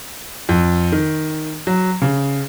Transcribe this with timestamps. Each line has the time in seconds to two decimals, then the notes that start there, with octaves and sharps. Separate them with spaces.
0.49 F2
0.92 D#3
1.67 F#3
2.02 C#3